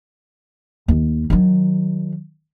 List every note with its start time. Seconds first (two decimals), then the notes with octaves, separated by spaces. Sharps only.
0.88 D#2
1.30 D#3 F#3